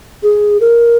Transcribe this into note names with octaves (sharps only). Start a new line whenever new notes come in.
G#4
A#4